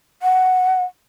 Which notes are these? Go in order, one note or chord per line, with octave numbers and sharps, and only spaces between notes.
F#5